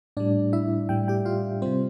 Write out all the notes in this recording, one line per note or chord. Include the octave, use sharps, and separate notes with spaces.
A2 G3 D4 D5
E4 E5
A2 G3 G5
G4 G5
F4 F5
C3 G3 C4 C5